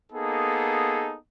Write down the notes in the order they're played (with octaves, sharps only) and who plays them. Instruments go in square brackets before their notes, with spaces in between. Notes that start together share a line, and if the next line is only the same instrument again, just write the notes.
[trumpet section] A#3 B3 D#4 G#4 A4